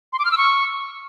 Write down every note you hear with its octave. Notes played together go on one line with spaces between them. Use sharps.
C6
D6
F6
E6
C#6